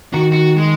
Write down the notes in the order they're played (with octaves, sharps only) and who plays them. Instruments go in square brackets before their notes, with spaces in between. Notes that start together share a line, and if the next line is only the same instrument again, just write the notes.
[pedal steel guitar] D#3 [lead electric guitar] F#4
[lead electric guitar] F#4
G#3